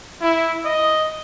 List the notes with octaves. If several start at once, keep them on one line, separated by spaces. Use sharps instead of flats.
E4
D#5